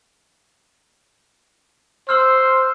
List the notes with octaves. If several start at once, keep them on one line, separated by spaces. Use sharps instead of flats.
C5 C6 E6 F6